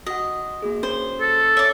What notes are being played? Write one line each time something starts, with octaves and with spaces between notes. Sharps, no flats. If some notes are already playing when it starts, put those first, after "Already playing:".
F#4 D#5 F#5
A#3 F#4 G#4
C#4 C5
A4
C#5 D5 E5